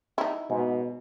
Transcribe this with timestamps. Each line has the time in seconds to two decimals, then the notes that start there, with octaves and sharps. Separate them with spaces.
0.18 D#4 E4
0.50 G#2 B2